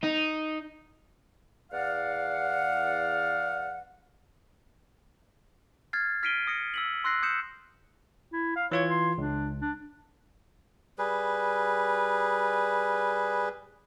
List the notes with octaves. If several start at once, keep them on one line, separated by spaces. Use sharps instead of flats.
D#4
E2 D5 F5 F#5
F6 G#6 A6 C7
F6 B6 C7 D7 D#7 G7
D#6 A#6 C#7
E6 B6 F#7
C6 E6 F#6 A#6 C7
D#6 G6 C#7 E7
E4
F5
E3 F4 C#5 G#6
C6
C#2 D4
D4
G3 G#4 B4